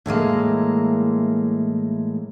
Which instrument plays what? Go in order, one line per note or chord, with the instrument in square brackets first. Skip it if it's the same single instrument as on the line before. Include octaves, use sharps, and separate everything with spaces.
[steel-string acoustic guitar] A2 E3 G#3 A#3